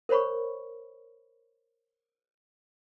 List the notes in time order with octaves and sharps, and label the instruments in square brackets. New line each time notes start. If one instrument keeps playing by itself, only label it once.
[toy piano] A#4 C5 C#5 B5 C#6